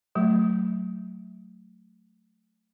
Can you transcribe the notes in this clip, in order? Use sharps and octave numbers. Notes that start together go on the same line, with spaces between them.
F#3 A3